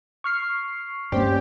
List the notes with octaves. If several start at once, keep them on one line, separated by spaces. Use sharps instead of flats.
C#6 F6 C7
G2 A#3 C#4 G4 C5 D5